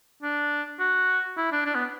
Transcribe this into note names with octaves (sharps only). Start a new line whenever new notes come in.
D4
F#4
E4
D4
D4
B3